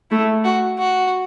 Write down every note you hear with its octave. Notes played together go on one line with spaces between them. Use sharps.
A3 E4
F#4
F#4